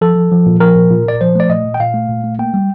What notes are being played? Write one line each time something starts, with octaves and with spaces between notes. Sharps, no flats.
F3 A4
F3
F3
A#2
F3 A#4
A#2
A#2
A#2 D5
F3 C5
A3 D5
A#2 D#5
A#2
G5
A#2 F5
A3
A#2
A3
A#3 G5
G3